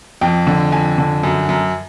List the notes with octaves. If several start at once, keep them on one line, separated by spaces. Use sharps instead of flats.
F2 G5
D3
F2 G#5
D3
F#2
F#2